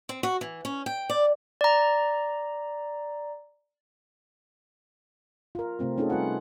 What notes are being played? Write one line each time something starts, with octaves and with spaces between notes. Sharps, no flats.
C4
F#4
E3
C#4
G5
D5
D5 A#5
F4 A#4
C3 A3 C4 F4
A3 C#4 D#4 F4 G#4 A4
G3 F4 B4 F#5